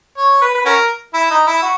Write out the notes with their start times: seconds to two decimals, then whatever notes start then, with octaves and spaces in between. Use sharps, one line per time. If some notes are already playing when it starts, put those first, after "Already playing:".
0.17 C#5
0.42 B4
0.55 B4
0.66 C#4 F#4 A#4
1.14 E4
1.31 D#4
1.47 E4
1.62 F#4